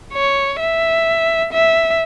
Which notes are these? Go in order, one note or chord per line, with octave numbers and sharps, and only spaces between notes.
C#5
E5
E5